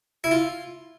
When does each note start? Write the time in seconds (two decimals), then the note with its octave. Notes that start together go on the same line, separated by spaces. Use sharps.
0.24 E4
0.31 F4